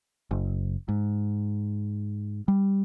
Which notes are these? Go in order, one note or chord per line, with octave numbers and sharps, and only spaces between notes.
F#1
G#2
G3